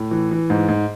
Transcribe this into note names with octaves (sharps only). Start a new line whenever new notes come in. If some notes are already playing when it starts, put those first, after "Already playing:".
Already playing: A2
E3
E3
G#2
G#2